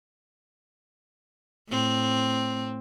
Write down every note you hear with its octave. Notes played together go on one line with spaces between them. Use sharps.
A2 C4